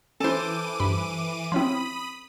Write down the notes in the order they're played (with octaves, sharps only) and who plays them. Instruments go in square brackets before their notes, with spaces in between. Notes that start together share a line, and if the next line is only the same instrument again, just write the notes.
[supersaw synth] E3 D6 D#7 [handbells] C#4 E4 [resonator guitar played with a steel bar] A4 C5
[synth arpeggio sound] G2 B5
[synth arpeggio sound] F3 C#4 E4 [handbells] C4 C6 [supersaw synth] B5 D#6